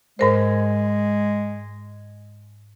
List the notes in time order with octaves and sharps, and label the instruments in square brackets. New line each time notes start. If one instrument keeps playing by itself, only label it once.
[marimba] G#2 A#4 C5 [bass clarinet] G#3